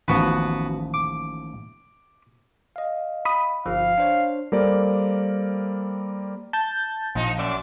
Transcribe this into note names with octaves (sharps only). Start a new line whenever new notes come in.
A1 D#2 F3 B3 F#4 B4
D6
D#5 F5
B5 D#6
G1 F3 F5
D4 C5 C#5
G3 A#3 A4 A#4 C5 D5
A5 G6 A6
A#1 F3 D#4
F#2 D5 E5